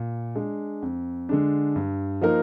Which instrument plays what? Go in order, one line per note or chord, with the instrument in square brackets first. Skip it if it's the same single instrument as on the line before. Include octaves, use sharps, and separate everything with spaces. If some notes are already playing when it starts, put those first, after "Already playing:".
Already playing: [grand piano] A#2
G#3 D4
F2
D3 G#3 D4
G2
F3 A#3 D#4 A#4